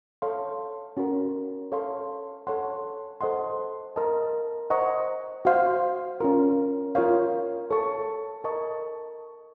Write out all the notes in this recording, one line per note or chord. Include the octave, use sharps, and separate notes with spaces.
A4 C#5 F5 C6
C#4 F#4 A#4
A4 C#5 F5 C6
A4 C#5 F#5 C6
A4 C5 D#5 F#5 C6
A#4 D#5 A5
C5 D#5 F#5 A#5 C#6
F#4 C5 F5 C6
C#4 F4 A#4
F4 A#4 C#5 F5
A4 C#5 A5 C#6
A#4 D#5 A5 C#6